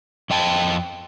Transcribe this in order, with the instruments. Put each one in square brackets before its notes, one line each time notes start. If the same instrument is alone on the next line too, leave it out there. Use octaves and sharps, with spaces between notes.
[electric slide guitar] F2 D#5 G5 A5